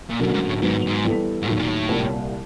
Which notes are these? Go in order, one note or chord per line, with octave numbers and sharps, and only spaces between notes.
A#2
B2 D3 F#3 A#3 C#4 F#4
G#2
A2
G#2 D#3 F#3 B3
G#2
E3 G3 B3 E4 A4
G#2
D#2 A2 D#3 F#3
A#2
A2
C2 A#2 G3 A#3